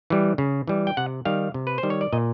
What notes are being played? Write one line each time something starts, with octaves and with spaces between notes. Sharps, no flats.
E3 G3
C#3
E3 G3
G5
C3 F#5
D#3 G3 F5
C3
B4
C5
D#3 G3
C#5
D5
A#2 D#5